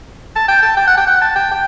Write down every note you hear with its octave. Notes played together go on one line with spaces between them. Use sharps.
A5
G5
A5
G5
F#5
G5
F#5
A5
G5
G5